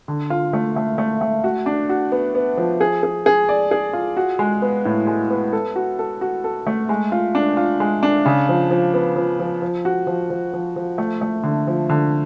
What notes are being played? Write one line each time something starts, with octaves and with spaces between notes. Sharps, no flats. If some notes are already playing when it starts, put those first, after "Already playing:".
D3
F4
A3
A3
A3
A3
F#4
D4
F#4
B3
B3
F3
G#4
G#4
G#4
D5
G#4
F4
F#4
G#3
B3
A2
G#3
B3
A4
F#4
A4
F#4
A4
A3
G#3
F4
D4
F4
G#3
D4
C#3
F3
F3
B3
F3
F3
F3
F#4
F3
F3
F3
F3
A3
A3
D3
F3
D3